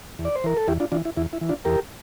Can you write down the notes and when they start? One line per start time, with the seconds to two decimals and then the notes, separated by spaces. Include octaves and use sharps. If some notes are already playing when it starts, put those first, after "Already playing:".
0.19 E2
0.25 D5
0.36 C5
0.44 E3 A#4
0.57 A4
0.68 E2 E4 G4
0.80 D4 F4
0.92 E3 D4 F4
1.05 E4
1.17 E2 E4
1.33 E4
1.41 E3
1.49 D4 F4
1.65 E2 G4 A#4